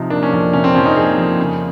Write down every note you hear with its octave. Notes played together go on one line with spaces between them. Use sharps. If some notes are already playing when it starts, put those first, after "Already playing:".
Already playing: C3 F3 D#4
A#3 D4
C#4
F2 D4
C3 C#4
C4
F3 C#4
D#4
A#3 G#4
F2
C#3